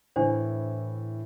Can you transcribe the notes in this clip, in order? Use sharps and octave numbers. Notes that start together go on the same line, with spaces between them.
A2 E3 D4 C5